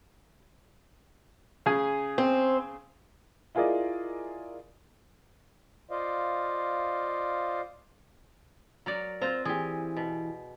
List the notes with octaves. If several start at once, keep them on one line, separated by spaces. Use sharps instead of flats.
C#3 G#4 G#5
C4
E4 F4 G#4 A#4 D5 D#5
F4 C5 D5 D#5 F5
F#3 A#4 D5
C4 F4 C5 A#5
E3 G4 G#4
B2